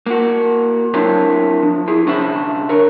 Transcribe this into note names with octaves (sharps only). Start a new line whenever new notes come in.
A#3 F#4
F#3 C4 D4 E4 A#4 C#5
F3
E4 G#4
C2 D3 C#4 C5 E5 B5
A#4 C#5